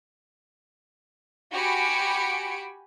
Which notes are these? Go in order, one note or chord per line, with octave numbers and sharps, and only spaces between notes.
F#4 G4 G#5 B5 C#7 D7